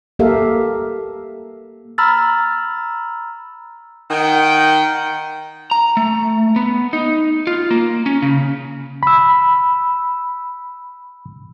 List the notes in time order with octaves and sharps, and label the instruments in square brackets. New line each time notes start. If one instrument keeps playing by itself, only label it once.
[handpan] A#3 G4 A4 A#4 E5 F5
[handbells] A#5 B5 E6 F6 A6
[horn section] D#3 F#5 G5
[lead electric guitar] A#5
A3
B3
D#4
F4
A#3
C#4
C#3
[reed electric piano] B5 E6